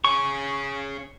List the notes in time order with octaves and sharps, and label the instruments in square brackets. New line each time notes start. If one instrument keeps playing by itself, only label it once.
[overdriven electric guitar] C#4 G#4 [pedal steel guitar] C#6